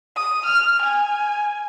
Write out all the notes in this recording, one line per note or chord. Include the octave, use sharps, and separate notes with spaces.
D#6
F6
G#5